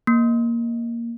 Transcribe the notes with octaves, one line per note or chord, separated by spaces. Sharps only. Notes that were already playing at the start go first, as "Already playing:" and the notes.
A#3